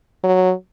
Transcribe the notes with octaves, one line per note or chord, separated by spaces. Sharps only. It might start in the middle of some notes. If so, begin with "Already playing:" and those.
F#3